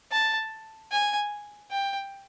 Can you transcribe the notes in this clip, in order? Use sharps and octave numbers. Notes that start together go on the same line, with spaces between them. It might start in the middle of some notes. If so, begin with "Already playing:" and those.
A5
G#5
G5